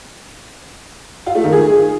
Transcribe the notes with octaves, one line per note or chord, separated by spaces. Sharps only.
F4
A3
D#3
G#4